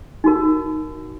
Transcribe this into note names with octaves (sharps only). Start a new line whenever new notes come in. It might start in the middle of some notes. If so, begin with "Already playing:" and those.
D#4 F#4 A#4